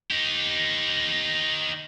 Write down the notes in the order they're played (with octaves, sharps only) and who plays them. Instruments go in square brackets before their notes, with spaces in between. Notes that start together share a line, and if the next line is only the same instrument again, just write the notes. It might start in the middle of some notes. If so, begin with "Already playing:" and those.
[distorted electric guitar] D#4 G4